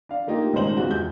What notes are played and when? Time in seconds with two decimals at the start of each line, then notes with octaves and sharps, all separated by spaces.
0.09 D4 F5
0.27 A3 A#3 D#4 F4 G4
0.53 D#1 G#1 C#3 D#4 C5 F#7
0.77 G3 G#3 B3 C4 F4 F#4
0.91 E2 G6